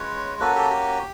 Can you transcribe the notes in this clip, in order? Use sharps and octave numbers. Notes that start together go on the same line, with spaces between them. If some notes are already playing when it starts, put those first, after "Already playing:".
Already playing: G#3 C#4 F4 B4 C#5
A#3 C#4 F#4 A4 B4
G4 A4
G4